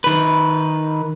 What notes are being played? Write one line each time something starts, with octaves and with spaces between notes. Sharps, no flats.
D#3 B4